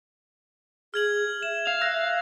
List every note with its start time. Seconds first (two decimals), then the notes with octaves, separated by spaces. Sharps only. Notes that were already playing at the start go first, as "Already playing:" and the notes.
0.94 G#4 F6 G#6 F#7
1.43 E5 E7
1.67 F5
1.81 E6 F#6 A#6